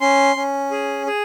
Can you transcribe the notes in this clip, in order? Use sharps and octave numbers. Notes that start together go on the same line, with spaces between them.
C#4 C6
C#4
G#4
G#4